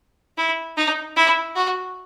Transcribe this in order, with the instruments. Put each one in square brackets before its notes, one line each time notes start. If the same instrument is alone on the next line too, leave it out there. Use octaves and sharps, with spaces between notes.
[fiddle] E4
D#4
E4
F#4